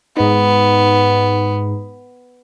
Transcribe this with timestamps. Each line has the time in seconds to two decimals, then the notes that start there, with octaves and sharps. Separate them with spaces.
0.17 G#2 B3 D#4